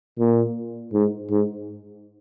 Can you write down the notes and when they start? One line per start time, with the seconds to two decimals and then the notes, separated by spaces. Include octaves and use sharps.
0.19 A#2
0.93 G#2
1.30 G#2